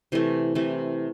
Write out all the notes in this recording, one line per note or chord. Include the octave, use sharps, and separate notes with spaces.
C3 E3 A3
C3 E3 A3